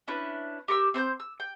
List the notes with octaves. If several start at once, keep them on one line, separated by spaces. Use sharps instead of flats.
C#4 D4 E4 B4
G4 A#4 C#6 E6
C4 C5 A#5 G6
E6
G5